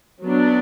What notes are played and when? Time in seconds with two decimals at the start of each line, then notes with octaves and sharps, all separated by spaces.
0.24 F#3 B3 D4